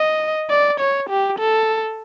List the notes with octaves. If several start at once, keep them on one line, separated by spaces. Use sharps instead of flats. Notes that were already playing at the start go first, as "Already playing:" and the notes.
Already playing: D#5
D5
C#5
G4
A4